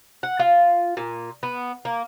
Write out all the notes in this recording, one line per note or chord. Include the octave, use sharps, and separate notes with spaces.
F#5
F4
A#2
B3
A#3